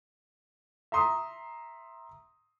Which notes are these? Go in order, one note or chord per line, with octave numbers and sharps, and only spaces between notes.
E5 A#5 C6 D#6